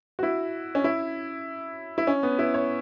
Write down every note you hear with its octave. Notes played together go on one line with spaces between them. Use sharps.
F#4
E4
C#4
E4
E4
C#4
B3
E4
C#5